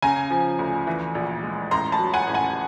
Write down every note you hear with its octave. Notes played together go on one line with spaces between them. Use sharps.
C#3 G#5 A#5
F3
D2
E3
A#1
G#3
A1 A#5 C6
A5 B5
F#3
F#5 G#5
A1
F#5 G#5